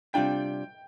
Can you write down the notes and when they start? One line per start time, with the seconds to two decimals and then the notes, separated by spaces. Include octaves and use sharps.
0.14 C3 G3 D4 F4 G5